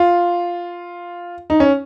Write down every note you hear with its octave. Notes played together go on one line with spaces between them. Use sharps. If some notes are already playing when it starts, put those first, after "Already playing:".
Already playing: F4
D#4
C#4